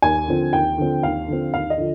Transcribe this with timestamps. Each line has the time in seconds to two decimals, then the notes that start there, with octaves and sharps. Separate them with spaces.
0.02 D#2 G#5
0.28 D3 F3 C4
0.53 D#2 G5
0.78 D3 F3 C4
1.03 D#2 F5
1.28 D3 F3 C4
1.53 D#2 F5
1.70 D#5
1.78 D3 F3